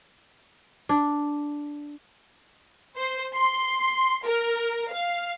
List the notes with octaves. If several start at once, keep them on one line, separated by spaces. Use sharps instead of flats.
D4
C5
C6
A#4
F5